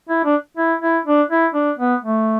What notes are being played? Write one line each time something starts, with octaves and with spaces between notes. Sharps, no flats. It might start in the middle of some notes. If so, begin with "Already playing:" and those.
E4
D4
E4
E4
D4
E4
D4
B3
A3